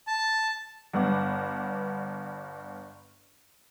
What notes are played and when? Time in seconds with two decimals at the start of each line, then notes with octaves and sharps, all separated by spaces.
0.07 A5
0.94 G1 G2 B3 F#5 D6